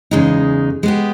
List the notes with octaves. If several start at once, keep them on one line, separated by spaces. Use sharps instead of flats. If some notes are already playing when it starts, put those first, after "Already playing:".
E2 C#3 G#3 D#4
G#3 B3 G4